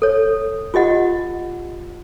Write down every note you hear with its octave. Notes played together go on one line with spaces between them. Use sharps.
A4 C#5
F4 G4 D#5 F#5